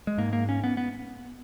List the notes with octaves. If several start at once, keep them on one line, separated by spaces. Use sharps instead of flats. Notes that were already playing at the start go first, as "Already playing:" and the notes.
G#3
G#2 A#3
A#3
C#4
B3
B3